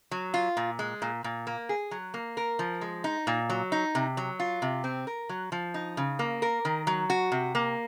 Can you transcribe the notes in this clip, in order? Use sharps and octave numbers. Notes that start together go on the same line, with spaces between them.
F#3
F4
A#2
G#3
A#2
A#2
A#3
G#4
F#3
A#3
A#4
F3
G#3
D#4
A#2
F#3
D#4
C3
F#3
F4
C3
C4
A#4
F#3
F3
D#4
C#3
A#3
A#4
D#3
F#3
F#4
C3
A#3